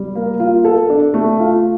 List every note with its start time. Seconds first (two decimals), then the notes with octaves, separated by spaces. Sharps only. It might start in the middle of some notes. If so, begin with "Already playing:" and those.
Already playing: G3
0.15 A#3
0.40 F4
0.65 A4
0.90 D4
1.14 A3
1.40 F4